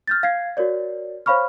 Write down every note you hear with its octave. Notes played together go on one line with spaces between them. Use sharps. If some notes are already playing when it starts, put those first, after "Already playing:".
F6 G6 A6
F5 G#6 C7
F#4 A#4 C#5 D5
C5 C#5 F5 B5 C#6 F6